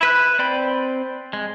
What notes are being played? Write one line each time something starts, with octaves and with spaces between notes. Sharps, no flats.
E4 B4 F#6
C4 D5 G5 B5
G#3